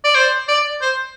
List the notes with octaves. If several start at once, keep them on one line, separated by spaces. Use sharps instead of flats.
D5
C5
D5
C5